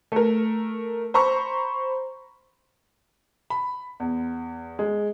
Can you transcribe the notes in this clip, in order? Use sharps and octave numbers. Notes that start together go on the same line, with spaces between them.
A3 A#4
C5 A#5 B5 C#6
B5
E2
G#3